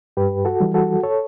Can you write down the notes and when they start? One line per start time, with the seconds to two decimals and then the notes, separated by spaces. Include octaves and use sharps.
0.17 G2 G4 B4
0.45 F#4 A4
0.60 E3 G3
0.74 F#4 A4
1.03 A4 C#5